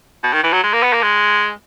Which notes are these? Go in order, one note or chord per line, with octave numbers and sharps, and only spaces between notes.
B2
D#3
E3
F#3
G#3
A#3
B3
A#3
G#3